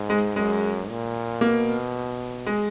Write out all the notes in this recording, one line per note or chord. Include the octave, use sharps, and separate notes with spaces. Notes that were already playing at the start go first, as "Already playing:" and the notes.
Already playing: G#2
G#3
F#2 G#3
A#2
B2 A#3
G#3